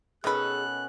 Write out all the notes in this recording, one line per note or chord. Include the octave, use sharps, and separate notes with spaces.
B2 D#3 C#4 G#4 A4 B4 F#6